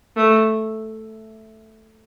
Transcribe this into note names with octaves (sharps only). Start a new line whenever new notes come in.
A3